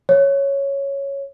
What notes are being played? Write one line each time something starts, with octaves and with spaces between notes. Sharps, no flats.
C#5